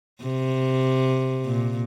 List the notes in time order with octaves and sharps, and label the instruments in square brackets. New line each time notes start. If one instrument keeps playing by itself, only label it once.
[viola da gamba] C3
A#2